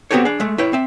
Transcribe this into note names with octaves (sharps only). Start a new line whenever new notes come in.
B3 C4 F#4 G4 A4 C#5
D4 G#4
G#3 A3
E4 B4 C#5 G5
C4 E5